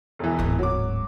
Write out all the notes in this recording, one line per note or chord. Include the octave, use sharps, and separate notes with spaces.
E1 E3
D1 G#2
F#3 D6